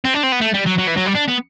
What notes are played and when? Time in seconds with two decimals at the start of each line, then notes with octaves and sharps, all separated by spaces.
0.05 C4
0.14 D4
0.24 C4
0.32 B3
0.41 A3
0.54 G3
0.67 F#3
0.79 F#3
0.88 E3
0.98 F#3
1.07 G3
1.16 D4
1.28 B3